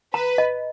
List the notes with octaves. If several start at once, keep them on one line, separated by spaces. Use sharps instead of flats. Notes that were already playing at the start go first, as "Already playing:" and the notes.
B4 A#5
D#5